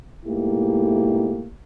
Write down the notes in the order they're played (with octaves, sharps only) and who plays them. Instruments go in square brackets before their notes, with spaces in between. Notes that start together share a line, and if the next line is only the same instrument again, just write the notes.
[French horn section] G#2 B2 A3 A#3 E4 G4